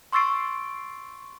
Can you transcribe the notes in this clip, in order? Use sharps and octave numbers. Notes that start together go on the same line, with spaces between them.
C6 C#6 E6 A6 C7 D7